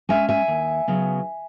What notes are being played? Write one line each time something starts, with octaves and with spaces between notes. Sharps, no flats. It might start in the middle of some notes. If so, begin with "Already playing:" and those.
G#3 C#4 E5 G#5
E5 G#5
D#2
C#3 F#3 B3